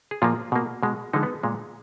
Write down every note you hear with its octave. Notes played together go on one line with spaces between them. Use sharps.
G#4
A#2 F3 A#3 F4
B2 A#3
B2 G#3
D3 F3 G#3 D#4
B3
A#2 G#3